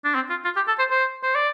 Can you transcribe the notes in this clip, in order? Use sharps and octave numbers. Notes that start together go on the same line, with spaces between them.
D4
C4
F4
F4
G4
A4
C5
C5
C5
D5